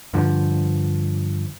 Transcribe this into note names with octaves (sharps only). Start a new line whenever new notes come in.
G2 D3 F3